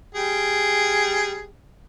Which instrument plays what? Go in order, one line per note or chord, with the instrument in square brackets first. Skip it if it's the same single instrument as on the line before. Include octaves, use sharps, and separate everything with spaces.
[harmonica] G3 G#4 G5